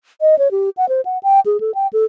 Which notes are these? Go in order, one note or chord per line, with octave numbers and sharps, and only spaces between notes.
D#5
C#5
G4
F#5
C5
F#5
G5
G#4
A4
G5
A4